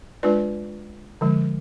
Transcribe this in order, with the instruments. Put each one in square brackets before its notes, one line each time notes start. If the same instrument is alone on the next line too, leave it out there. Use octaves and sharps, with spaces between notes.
[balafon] G#3 D4 F4 B4 D5
D3 F3 G#3